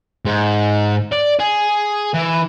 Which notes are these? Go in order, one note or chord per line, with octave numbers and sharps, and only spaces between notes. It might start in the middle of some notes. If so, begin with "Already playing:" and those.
G#2
D5
G#4
E3